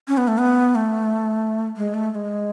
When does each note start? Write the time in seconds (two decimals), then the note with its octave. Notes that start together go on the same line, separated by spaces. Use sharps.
0.08 C#4
0.18 B3
0.28 A3
0.38 B3
0.75 A3
1.77 G#3
1.94 A3
2.11 A3
2.15 G#3